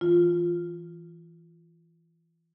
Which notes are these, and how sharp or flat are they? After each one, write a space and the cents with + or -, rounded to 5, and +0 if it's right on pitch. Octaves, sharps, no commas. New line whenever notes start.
E3 +0 F4 +0